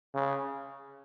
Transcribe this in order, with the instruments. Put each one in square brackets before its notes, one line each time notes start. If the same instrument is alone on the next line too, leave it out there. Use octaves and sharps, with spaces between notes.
[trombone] C#3